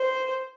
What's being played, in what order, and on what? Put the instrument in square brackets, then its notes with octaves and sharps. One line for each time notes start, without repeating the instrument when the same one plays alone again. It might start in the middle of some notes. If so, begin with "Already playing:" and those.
Already playing: [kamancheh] C5